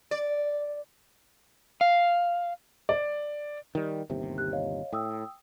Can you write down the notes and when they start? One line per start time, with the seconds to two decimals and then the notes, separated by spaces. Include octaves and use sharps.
0.11 D5
1.81 F5
2.89 D5
3.75 D#3 G3
4.10 G1 D#2 C3
4.38 G4 F#6
4.53 C#5 D#5 F5
4.93 A2 G5 D#6 E6